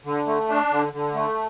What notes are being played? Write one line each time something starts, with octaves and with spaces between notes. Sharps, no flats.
D3
A3
D4
D3
D3
A3